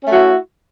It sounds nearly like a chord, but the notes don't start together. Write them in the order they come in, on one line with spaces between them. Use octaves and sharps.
C#4 A3 F#4 E4